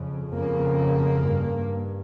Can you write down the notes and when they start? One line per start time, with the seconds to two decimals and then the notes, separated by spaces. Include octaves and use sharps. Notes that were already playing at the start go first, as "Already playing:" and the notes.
Already playing: F2 C#3
0.34 F2 C#3 A#3
1.26 G2